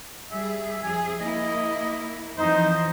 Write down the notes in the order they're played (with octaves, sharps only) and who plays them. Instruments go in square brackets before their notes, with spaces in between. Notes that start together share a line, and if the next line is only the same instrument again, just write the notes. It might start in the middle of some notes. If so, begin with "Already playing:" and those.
[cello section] G3 G#4 [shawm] E5
[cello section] F2 G#4 [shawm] G#5
[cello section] A#3 E4 [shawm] D#5
[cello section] F2 E3 F3 [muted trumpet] D#4 [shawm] C5